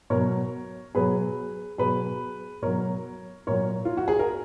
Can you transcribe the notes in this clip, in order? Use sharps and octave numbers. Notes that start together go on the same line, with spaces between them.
B2 F#3 A#4 C#5
B2 F#3 G#4 B4
B2 F#3 G#4 B4
B2 F#3 A#4 C#5
A#2 F#3 A#4 C#5
F4
F#4
G#4
A#4